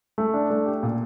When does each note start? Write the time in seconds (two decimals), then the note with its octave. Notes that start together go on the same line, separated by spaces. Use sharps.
0.18 A3
0.34 D4
0.50 A3
0.66 G4
0.83 A#2